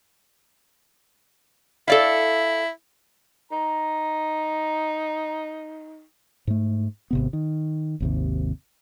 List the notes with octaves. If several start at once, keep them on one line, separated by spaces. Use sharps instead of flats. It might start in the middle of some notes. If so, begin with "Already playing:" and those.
E4 A4 D5 F5
D#4 A#5
G#2 A3
G#1 C3 B3
D#3
G#1 D#2 C3